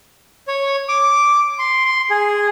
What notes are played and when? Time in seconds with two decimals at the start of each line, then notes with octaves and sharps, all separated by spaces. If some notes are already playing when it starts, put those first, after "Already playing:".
0.48 C#5
0.89 D6
1.59 C6
1.85 C6
2.10 G#4